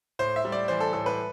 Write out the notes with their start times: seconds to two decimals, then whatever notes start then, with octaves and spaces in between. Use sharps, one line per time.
0.19 A2 C5
0.36 E5
0.45 G3
0.52 D5
0.68 E3 C5
0.80 A4
0.93 A2 A4
1.06 B4